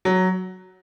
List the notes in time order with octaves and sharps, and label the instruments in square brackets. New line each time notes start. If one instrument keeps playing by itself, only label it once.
[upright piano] F#3